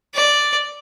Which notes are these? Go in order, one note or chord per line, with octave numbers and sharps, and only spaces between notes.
D5